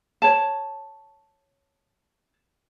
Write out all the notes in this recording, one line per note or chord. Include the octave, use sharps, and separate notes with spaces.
C#5 A5